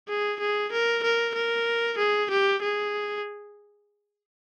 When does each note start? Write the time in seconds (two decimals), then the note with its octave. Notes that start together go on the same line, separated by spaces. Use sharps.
0.08 G#4
0.40 G#4
0.72 A#4
1.03 A#4
1.35 A#4
1.98 G#4
2.31 G4
2.62 G#4